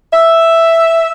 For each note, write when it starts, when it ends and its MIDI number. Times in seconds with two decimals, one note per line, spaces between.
0.11 1.11 76